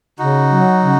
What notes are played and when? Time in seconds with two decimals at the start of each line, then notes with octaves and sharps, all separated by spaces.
0.19 C#3 D#4 F#4
0.50 F#3
0.81 C#3